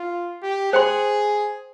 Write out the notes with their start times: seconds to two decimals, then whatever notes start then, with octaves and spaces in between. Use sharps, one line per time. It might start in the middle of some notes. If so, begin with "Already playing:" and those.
Already playing: F4
0.43 G4
0.73 G#4 C5 G5 C6